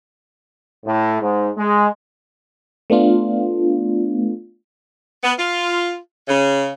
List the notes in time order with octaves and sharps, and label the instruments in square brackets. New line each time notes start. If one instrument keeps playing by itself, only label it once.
[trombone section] A2
G#2
G#3
[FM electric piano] A3 B3 D4 F4
[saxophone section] B3
F4
C#3